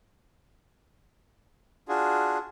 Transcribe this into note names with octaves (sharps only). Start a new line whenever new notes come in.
D4 F4 F#4 G#4